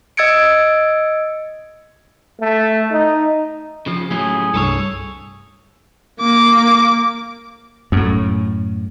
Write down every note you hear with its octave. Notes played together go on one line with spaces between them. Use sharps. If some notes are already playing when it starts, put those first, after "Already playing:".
D#5 E6 G#6 A6 C#7 D7
A3
D#4
C#3 F3
A2 F#3 C#4 G#4
C2 G2 A4 B4 C#5 E6
A#3 D6
F#2 A2